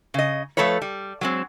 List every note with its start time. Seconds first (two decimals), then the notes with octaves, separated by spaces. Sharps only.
0.14 C#3 D#5
0.57 F3 A3 A4 B4 C#5
0.82 G3
1.21 F#3 G#3 C4